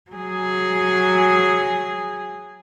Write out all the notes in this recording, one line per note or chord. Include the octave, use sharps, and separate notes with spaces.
F#3 G#4